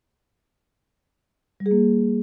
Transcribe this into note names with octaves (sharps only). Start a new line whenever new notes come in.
G3
G#4
A#3